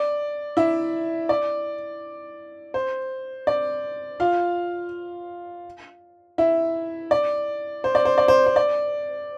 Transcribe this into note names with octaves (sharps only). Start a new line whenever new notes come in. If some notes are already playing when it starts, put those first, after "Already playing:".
Already playing: D5
E4 E5
D5
C5
D5
F4 F5
E4 E5
D5
C5
D5
C5
D5
C5
C5
D5